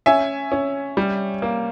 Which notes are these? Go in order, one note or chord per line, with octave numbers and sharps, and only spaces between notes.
C#4 E5 G#5
C#4
G3
A#3